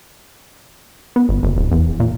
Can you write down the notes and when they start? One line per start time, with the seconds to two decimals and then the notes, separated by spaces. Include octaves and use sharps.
1.16 B3
1.29 G1
1.43 F#1
1.57 D1
1.72 E2
2.00 A#2